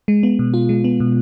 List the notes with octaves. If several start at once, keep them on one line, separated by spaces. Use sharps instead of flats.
G#3
B3
B2
F4
G#3
B3
B2